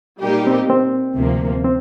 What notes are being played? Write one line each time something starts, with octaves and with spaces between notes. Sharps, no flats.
A#2 G3 A#3 D#4 G4
C4
C4
D2 C3 F3 A#3
C4